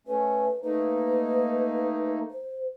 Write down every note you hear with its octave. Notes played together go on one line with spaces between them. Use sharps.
A3 C#4 B4
A3 A#3 D#4 B4
C5